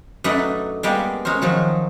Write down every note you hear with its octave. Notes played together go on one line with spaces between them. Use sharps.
F#2 A3 D4 D#4 B4 A#5
G3 G#3 A#3 B3 G4
G#3 C#4 A#4 C5
D#3 F3 F#3